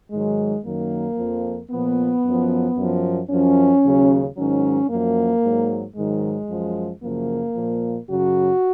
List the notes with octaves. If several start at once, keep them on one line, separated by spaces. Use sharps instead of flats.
G#2 D#3 F#3 G#3
F#2 D#3 F#3 A#3
F2 F3
A#2 F3 B3
F#2 F3
F#2 F3
F#2 F3 C#4
D#2 C#3 F#3
G#2 D#3 F#3 C#4
F#2 F3 A#3
G#2 F#3
G#2 D#3 F#3 G#3
F#2 F3
F#2 C#3 F3 A#3
A#2 F3
F#2 C#3 F#3 F#4